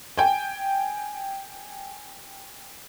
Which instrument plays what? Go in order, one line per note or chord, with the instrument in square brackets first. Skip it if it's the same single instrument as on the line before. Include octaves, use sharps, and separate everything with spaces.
[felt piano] G5 G#5